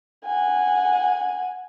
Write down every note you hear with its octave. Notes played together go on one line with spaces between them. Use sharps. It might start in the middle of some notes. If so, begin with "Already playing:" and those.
F#5 G#5